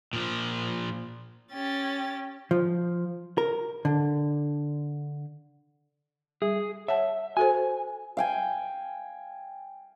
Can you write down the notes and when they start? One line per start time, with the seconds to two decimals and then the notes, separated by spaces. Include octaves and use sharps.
0.13 A#2 F3
1.52 C#4 G4 A6
2.51 F3
3.38 A#4
3.85 D3
6.42 G3 G#4
6.88 C#5 E5 F#5 A5
7.37 F#4 A4 C5 G#5
8.17 F5 G5 G#5